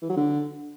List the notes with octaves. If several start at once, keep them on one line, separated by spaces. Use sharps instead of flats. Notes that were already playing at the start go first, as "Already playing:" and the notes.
E3
F#3
D3